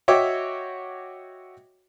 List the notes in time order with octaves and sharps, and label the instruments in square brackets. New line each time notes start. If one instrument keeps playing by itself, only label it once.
[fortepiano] F#4 C#5 D#5 E5 G5 D6